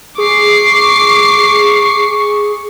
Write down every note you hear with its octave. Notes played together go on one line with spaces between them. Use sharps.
G#4 C#6 D6 C7